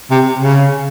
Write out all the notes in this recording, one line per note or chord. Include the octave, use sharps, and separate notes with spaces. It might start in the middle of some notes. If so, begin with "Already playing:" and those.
C3
C#3